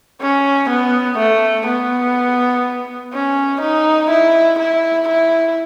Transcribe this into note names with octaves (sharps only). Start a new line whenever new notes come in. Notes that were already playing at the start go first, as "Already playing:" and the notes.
C#4
B3
A3
B3
C#4
D#4
E4
E4
E4